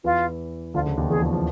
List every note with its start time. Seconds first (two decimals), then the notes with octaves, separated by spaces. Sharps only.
0.04 E2 E3 F4
0.74 D2 D3 F4
0.86 C#3
0.98 D#2 D#3
1.09 E2 E3 G#4
1.21 F2 F3
1.33 F3